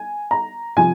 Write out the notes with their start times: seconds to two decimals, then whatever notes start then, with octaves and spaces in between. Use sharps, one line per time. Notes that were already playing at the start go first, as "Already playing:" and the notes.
Already playing: G#5
0.31 A#5
0.76 C3 F3 G#5